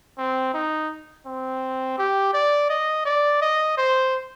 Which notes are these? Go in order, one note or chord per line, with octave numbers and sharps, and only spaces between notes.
C4
D#4
C4
G4
D5
D#5
D5
D#5
C5